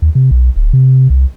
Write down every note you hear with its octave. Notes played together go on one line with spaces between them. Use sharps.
D#2
C3
B1
D1
C3
C2